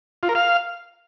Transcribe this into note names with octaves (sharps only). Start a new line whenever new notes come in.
F4
A#4
F5